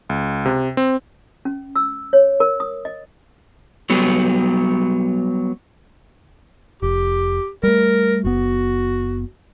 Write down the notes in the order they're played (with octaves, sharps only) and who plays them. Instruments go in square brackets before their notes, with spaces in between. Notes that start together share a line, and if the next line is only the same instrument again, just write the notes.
[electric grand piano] C#2
C3
C4
[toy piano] C#4
E6
C#5
A#4
D#6
D#5
[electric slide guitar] F#3 G3 B3 G4
[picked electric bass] F1 [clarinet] G4
[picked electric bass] G3 A3 [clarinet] A#4
[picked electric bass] F#1 B3 [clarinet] F#4